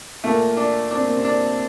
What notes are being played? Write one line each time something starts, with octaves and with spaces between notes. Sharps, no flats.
A#2 A3 A#3
D4
C4 D4
A#3
C3 C4
D4